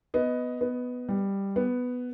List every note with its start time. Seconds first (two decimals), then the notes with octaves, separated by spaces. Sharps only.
0.14 B3 D#5
0.61 B3
1.09 G3
1.56 B3